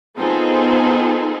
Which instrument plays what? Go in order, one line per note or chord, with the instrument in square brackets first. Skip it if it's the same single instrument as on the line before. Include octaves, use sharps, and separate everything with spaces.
[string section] B3 C4 D#4 F4 G#4 A4